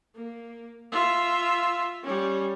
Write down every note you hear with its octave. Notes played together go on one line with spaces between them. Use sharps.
A#3
F4 E5
G3 C#4